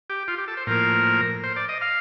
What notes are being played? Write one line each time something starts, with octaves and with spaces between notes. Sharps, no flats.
G4
F4
G4
A4
C5
A2 F3 A#3 A#4
C5
D5
D#5
F5